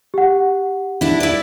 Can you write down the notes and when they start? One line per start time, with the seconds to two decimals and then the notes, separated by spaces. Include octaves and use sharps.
0.14 G4 F#5
1.01 D4 E4
1.20 E4 D5